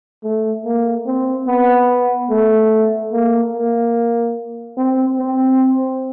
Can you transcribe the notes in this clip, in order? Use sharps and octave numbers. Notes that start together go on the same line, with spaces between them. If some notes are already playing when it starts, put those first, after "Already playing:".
A3
A#3
C4
B3
A3
A#3
A#3
C4
C4